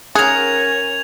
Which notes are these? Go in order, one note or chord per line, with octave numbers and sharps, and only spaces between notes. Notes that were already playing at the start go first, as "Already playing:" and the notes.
C#4 G#4 A#4 F#5 G#6 F7